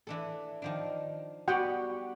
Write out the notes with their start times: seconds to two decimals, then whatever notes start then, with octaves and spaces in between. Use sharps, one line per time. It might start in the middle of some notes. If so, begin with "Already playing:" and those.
0.07 E3 D4 A4
0.62 D#3 F3 D4
1.48 G3 B3 F#4 G4 F#5 G5